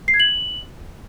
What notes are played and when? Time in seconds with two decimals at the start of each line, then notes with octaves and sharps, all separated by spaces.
0.08 C7
0.14 G#6
0.20 F#7